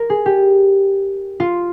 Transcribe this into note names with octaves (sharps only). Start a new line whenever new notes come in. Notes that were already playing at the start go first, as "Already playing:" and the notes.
Already playing: A#4
G#4
G4
F4